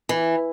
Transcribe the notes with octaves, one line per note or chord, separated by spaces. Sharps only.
E3